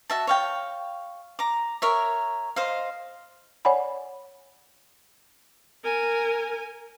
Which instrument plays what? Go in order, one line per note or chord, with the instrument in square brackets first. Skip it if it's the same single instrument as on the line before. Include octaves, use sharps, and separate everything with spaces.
[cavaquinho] F#4 E5 A5
C#5 F5 G5
A#5 D6
A#4 C#5 E5
C5 D#5 F5
[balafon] C#5 D5 F#5 G#5 B5
[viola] A#4 G#5